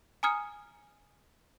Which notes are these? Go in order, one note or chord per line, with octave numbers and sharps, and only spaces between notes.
G#5 A#5 D#6 F6 G#6 C#7